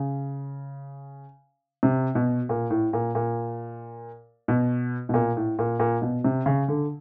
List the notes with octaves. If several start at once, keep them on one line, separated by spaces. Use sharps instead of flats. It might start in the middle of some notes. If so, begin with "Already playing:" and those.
Already playing: C#3
C3
B2
A#2
A2
A#2
A#2
B2
B2
A#2
A2
A#2
A#2
B2
C3
C#3
D3